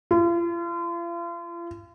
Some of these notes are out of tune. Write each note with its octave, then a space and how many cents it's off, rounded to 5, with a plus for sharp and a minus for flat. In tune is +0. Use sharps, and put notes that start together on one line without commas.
F4 -40